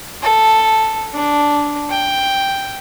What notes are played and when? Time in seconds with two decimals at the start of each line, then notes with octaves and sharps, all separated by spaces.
0.23 A4
1.14 D4
1.90 G5